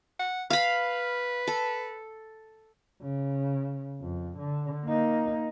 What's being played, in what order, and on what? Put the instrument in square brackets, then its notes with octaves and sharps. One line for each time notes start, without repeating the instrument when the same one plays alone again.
[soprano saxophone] F#5
[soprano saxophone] B4 [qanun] F5 B5
[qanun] A4
[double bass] C#3
F2
D3
A#3 D#4